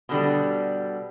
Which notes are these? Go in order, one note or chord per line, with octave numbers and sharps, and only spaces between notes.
B2 D3 G3